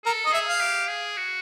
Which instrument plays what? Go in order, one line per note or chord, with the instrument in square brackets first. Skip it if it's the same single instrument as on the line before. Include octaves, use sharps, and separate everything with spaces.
[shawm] A4 [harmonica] A#4
[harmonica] D#5
[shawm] G#4 [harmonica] E5
[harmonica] F5
[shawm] G4
G#4
F#4